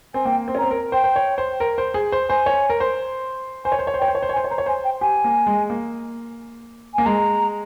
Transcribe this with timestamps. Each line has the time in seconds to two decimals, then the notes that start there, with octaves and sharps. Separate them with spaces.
0.14 C4 G#5
0.25 A#3 G5
0.48 C4
0.55 C#4
0.59 C4 A#5
0.71 A#4
0.92 C5 G5
1.04 C5
1.16 C#5
1.38 C5
1.60 A#4
1.78 C5
1.94 G#4
2.12 C5
2.29 C5 G#5
2.46 C#5
2.70 A#4
2.80 C5
3.65 C5 G#5
3.72 C#5
3.79 C5
3.87 C#5
3.94 C5
3.99 C#5 G5
4.08 C5
4.15 C#5
4.23 C5
4.29 C#5
4.33 G#5
4.37 C5
4.44 C#5
4.50 C5 A#5
4.58 C#5
4.66 C5 G#5
4.84 G5
5.01 G4 G#5
5.24 A#3
5.47 G#3
5.70 A#3
6.94 A#3 G#5
7.05 G#3 A#5